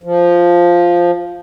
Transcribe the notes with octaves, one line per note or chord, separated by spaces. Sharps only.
F3